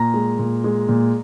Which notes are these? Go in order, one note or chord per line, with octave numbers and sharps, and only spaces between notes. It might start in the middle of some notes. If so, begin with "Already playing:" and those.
Already playing: A#2 A#5
G#3
A#2
G#3
A#2